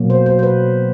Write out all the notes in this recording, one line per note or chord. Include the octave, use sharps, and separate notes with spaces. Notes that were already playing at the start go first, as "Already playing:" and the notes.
Already playing: B2 F#3 A#3
C5
C5
C5
B4